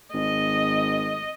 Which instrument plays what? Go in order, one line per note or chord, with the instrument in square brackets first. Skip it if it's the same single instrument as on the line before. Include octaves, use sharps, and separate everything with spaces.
[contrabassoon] G#1 [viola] D#5